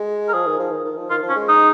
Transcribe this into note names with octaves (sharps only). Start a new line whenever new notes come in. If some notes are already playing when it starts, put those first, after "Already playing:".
Already playing: G#3
A#4
F3 G#4
D#3
F3
D#3
D#3
F3
D#3 F4
F3
C#4
G#3
D#4